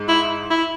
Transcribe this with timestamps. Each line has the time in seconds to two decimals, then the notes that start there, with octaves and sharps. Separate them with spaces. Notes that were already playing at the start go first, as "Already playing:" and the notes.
Already playing: G#2 G#3
0.08 E4
0.51 E4